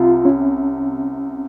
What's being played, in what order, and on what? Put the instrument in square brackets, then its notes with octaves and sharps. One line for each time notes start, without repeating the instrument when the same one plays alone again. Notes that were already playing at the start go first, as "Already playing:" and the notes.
Already playing: [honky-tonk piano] C2 C3 [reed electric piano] F4
[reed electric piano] C#4